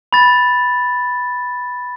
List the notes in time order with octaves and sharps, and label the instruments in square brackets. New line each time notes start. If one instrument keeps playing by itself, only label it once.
[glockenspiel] B5 A6